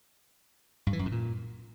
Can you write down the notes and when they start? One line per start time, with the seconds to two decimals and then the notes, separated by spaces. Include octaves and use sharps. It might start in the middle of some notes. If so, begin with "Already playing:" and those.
0.87 G2
0.93 E3
0.99 F#2
1.06 A2
1.12 A#2